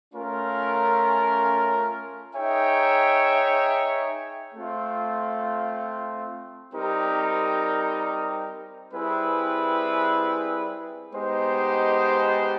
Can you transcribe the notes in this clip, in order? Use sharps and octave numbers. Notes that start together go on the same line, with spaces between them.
A3 C#4 F4 A#4
D#4 G#4 C#5 E5 G5
A3 C4 F4
G3 C4 D#4 G4 A#4
G3 C4 E4 G#4 B4
G#3 B3 D#4 G4 C5